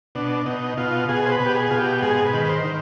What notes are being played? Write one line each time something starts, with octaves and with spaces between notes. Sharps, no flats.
B2 D4
B2 D#4
B2 F4
B2 G#4
C5
B4
B2
G4
G#4
B2 F4
G4
G#2 G#4
B4
D#3
B4
C5
D#3